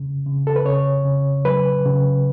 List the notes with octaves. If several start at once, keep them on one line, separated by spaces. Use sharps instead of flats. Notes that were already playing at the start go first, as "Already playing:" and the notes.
Already playing: C#3
C#3
A4
B4
C#3 C#5
C#3
F#3 B4
C#3